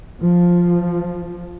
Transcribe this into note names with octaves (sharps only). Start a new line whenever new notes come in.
F3